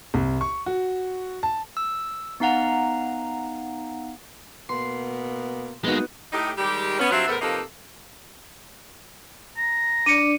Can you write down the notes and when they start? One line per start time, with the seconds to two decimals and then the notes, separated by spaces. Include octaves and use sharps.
0.14 C2
0.41 C#6
0.66 F#4
1.43 A5
1.77 E6
2.40 B3 D#4 F5 F#5 A#5
4.69 B2 A#3 B3 C6
5.84 G#3 A#3 B3 D#4 F#4
6.32 A2 D#4 G4
6.58 D#3 G3 G#3 G4
6.99 B3 C#4
7.11 G2 F#3 C4 F4 E5 F#5
7.28 E2 A2 B3 A4 A#4 C5
7.41 C3 F3 A#3 D#4 A4 B4
9.57 A#5
10.06 D4 D5 C#7 D#7